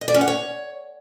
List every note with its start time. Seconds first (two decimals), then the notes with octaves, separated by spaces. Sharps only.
0.01 D#5
0.08 D5
0.14 C#4
0.21 F#5
0.28 C#5